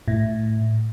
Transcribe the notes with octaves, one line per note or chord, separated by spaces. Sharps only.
A2